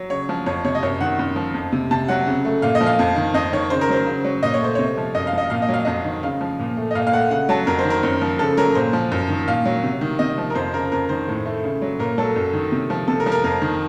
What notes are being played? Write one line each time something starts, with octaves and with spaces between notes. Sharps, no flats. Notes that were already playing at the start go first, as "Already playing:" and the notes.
Already playing: F#3
C#3 C#5
F3
F2 C#5
C3 C#5
D#5
F#2 C#5
D#3 F#5
F#2
F3
F2
C3
C3 A5
F#3 F#5
C#3
A3
A#2 F5
D#5
F3
F5
F2
D#3
F2 D#5
D#3 C#5
C#3 C5
A#4
F#3 C5
C#3
F#3
A#2 D#5
C#5
A3 C5
C3 C#5
F3
F#2 D#5
F5
F3 D#5
A#2 F5
D#5
F#3
F5
F2 D#5
D#3
C#3 F5
F3
A#2
A3
D#5
A#2 F5
F5
A3 F#5
C#3 F#5
F#3 A5
F2 A#4
C5
D#3
A#4
F#2
F3
C#3 A4
F#3 A#4
A#2 C5
F3
F#2
D#3
A#2 F5
F#3
C3
D#3
C3 D#5
F3
A#4
F2 C5
C#3 A#4
F2 A#4
D#3 C5
A2
A3
C#3
F#3
A#2 A#4
F#3 A4
F#2
D#3
C3
F3
C3 A4
A#4
F3
A#4
F2 A#4
D#3